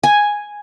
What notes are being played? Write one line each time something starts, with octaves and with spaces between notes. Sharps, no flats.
G#5